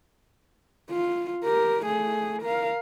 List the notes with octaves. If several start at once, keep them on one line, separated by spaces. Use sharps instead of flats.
F4
G4 A#4
A3 G#4
A#4 F5